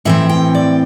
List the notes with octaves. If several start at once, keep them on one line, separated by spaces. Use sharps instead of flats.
A2 E3 C4 E5
G5
D5